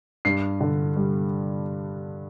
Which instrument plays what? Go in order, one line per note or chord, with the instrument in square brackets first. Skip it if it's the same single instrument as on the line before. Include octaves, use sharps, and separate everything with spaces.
[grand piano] G2 C7
D3
G3